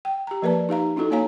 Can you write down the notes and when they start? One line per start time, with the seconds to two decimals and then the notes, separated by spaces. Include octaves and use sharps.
0.05 G5
0.27 G4 A#5
0.42 F3 A#3 A#4 B4 D5 A5
0.69 D#4 G4 F5 A#5
0.96 C#4 D#4 E4 F#4 A4
1.11 A#3 F#4 C#5 F5 G#5 A#5